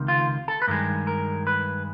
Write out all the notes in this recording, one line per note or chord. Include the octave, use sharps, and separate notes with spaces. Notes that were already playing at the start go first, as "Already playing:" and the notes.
Already playing: C#2 C3 D#3
F4
A4
B4
G2 D#3 G#3 A#4
A#4
B4